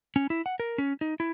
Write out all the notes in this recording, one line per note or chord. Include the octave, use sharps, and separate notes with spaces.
C#4
E4
F#5
A#4
C#4
D#4
E4